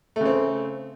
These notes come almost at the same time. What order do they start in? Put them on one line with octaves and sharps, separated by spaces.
A3 C#3 C4